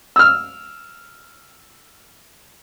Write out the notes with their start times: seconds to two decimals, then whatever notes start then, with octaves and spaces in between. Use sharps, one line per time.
0.16 E6 F6